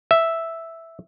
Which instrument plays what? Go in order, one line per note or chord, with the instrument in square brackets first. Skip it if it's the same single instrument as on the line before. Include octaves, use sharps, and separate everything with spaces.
[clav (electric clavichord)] E5